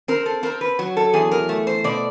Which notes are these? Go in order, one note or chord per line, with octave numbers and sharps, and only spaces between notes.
C4 A#4
A4
C4 A#4
B4
F#3
A4
E2 G#4
A#4
A3
C5
B2 D5